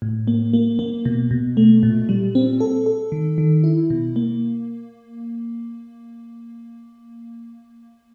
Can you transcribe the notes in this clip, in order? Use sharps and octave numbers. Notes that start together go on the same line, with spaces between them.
A2
A#3
A#3
A#3
B2
B2
A3
A#2
G3
C4
A4
A4
D#3
D#3
E4
B2
A#3